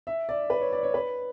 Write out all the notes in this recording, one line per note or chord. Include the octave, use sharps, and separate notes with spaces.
E5
D5
B4
C#5
D5
C#5
B4